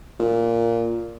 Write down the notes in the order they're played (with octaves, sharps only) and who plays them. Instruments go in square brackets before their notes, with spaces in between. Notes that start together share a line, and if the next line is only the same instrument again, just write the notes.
[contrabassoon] A#2